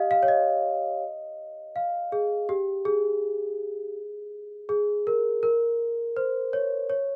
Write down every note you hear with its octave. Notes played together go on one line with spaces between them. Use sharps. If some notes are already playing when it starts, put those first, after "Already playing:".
Already playing: G4 D#5 F5
F5
C#5
D#5
F5
G#4
G4
G#4
G#4
A#4
A#4
C5
C#5
C#5